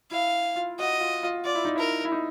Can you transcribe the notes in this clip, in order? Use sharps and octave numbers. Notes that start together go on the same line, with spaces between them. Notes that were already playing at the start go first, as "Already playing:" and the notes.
E4 F5
F4
F#4 D#5
F4
F4
F4 D5
E4
D#4
E4 A#4
E4
D#4